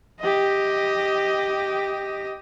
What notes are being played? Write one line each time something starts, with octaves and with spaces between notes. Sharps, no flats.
G4 D#5